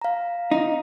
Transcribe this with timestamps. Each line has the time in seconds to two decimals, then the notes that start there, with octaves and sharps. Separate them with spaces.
0.02 F5 A#5
0.51 D#4